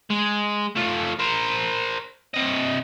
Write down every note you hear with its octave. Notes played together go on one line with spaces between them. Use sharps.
G#3
A3 F4
A#4 C5
C3 D#5